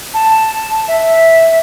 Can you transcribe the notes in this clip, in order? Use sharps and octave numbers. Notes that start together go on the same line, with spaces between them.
A5
E5